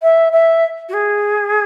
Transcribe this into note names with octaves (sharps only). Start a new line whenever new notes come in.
E5
E5
F#4
G#4